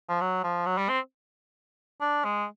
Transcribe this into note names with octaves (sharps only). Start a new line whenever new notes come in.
F3
F#3
F3
F#3
G3
C4
D4
G#3